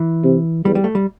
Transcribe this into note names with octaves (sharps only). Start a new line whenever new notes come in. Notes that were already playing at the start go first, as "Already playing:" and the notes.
Already playing: E3
C3
E2 G3
G3
A3
G3